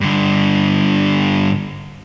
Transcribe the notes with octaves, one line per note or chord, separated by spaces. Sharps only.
G2 D3